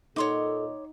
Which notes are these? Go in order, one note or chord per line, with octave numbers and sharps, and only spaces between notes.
A#2 D#4 A4 C#5 D#5 F#5 C6 D6